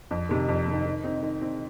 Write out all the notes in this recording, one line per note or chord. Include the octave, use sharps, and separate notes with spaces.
F2
C3 D#3
F2
C3 D#3
D#3
C4 D#4
D#3
C4 D#4